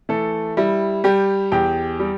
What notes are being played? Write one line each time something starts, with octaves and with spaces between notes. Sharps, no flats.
E3 A3 A4
G3 E4
G3 G4
E2 G4 G5
G3